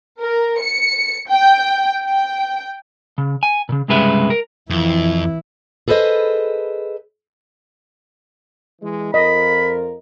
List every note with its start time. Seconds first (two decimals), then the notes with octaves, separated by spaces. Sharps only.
0.18 A#4
0.61 C#7
1.28 G5
2.02 G5
3.18 C#3
3.43 G#5
3.69 A#2 C#3
3.88 C2 G2 C#3 G#3 B4 E5
4.30 A#4
4.70 F2 E3 E4
5.88 G#4 A4 B4 C5 D#5
8.81 E3 G#3
9.14 F2 F4 A#4 D#5 B5